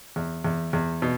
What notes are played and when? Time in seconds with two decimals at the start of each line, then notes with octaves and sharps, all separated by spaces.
0.16 E2
0.44 E2
0.73 E2
1.02 B2